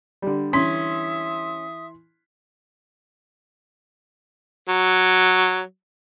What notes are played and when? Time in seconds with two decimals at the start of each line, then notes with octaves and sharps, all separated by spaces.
0.22 D3 G3
0.53 E3 C#4 E5 C6 D#6 B6
4.69 F#3